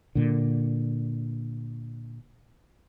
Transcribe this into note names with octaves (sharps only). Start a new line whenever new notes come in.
A#2 D3